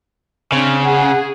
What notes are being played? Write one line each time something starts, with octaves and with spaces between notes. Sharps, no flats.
C#3 C4 D4
G#4 F#5